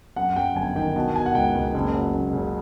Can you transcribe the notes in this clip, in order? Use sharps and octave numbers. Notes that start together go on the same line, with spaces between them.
F#2 F#5
F#2 G5
G1 G#5
D#3 G5
B2 A5
B2 G#5
F#5
C#2 G5
C#2
F#1
F#3
F#1
C#3